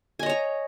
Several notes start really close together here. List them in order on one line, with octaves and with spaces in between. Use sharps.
G#5 D#5 C#5 A#5